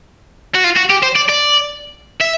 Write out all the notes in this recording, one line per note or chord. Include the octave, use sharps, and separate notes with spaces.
F#4
F4
F#4
G4
C5
D5
D5
E5